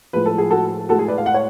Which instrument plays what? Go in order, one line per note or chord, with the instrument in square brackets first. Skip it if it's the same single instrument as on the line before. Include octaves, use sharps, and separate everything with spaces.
[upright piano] A2 F3 G#3 B4
A4
G#4
F#4 A4
A2 G#3 F#4 A4
G#4
B4 D5
F5
F#5
C#5